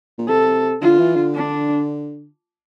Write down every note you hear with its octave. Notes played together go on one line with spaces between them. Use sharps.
A#2
C3 A4
D3 F4
E3
D3
D4